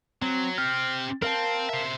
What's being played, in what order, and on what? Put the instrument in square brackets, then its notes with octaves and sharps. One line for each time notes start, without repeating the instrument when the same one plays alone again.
[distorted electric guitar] F#3 [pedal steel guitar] C4
[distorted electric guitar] C4 G4 [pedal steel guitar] F6
[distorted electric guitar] C4 [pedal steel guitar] A#4 F5 A5
[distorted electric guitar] C5 E5